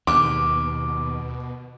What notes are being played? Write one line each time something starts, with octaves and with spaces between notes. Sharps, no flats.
D#2 B2 D6